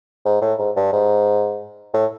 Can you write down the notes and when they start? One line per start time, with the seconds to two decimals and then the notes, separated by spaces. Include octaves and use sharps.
0.25 G#2
0.42 A2
0.59 G#2
0.76 G2
0.93 G#2
1.94 A2